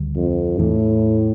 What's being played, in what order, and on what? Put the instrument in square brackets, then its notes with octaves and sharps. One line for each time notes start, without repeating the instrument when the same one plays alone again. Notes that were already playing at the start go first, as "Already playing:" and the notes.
Already playing: [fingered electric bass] D2 D3 G3
[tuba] F2
[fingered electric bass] E2 E3 A#3 D4 [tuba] A2